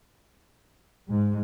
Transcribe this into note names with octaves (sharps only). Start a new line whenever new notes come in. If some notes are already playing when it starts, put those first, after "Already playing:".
G#2